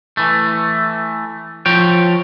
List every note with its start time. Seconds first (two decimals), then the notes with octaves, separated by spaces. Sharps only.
0.17 E3 A3
1.66 F3 C#5 G5